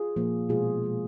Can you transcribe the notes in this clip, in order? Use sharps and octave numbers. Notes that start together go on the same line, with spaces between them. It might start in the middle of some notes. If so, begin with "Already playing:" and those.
Already playing: F4 G#4
A#2 F3 A#3
B2 G#3 F4 G#4
B2 G#3